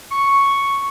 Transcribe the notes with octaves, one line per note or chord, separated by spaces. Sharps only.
C#6